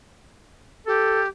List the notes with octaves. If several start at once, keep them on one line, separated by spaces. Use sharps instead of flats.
G4 A4